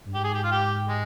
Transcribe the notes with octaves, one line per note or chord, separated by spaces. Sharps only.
G2
G#2 G4
G#4
G4
F4
G4
G#3